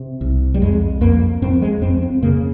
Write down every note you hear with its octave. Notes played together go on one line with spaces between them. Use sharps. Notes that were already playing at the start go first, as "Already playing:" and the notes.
Already playing: C3
C2
G3
F2 G#3
F2 A#3
F2 C4
G#3
F2 C4
C4
C#3 A#3